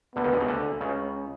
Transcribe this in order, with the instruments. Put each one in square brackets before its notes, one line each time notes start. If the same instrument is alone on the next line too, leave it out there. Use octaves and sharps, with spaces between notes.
[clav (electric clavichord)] D2 D3 [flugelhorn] B3
[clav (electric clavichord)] D#2 D#3
D2 D3
C#2 C#3
D2 D3
[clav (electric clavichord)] C#2 C#3 [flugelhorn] C#4